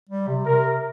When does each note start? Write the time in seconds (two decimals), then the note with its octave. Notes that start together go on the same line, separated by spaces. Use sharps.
0.09 G3
0.27 C3
0.45 C3 A#4